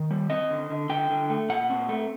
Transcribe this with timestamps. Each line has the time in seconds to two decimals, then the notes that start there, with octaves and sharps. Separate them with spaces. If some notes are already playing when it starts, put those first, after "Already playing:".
Already playing: D#3
0.11 G3
0.30 C4 D#5
0.51 D3
0.70 D3
0.89 D3 G5
1.10 D3
1.30 A3
1.49 A#2 F#5
1.70 C4
1.89 A3